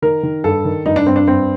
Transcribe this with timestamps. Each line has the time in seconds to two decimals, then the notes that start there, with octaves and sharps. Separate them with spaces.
0.02 D#3 A#4
0.23 D#3
0.44 G2 A4
0.65 D#3
0.86 G2 D#4
0.96 D4
1.06 G2 C4
1.16 D4
1.27 G2 C4